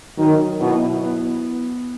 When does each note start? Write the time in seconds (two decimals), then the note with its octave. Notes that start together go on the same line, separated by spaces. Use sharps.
0.17 D#3 F#3
0.60 B2 E4
1.03 B3